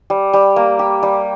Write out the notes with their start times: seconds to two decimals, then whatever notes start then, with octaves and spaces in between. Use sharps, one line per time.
0.10 G3
0.33 G3
0.56 A#3
0.79 G4
1.03 G3